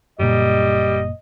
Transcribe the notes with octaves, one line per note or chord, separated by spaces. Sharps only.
F#1 A#2 G3 D#5